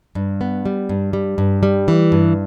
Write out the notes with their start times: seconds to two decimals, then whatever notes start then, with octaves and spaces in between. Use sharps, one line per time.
0.15 G2
0.41 B3
0.66 G3
0.89 G2
1.13 G3
1.38 G2
1.63 G3
1.88 E3
2.12 G2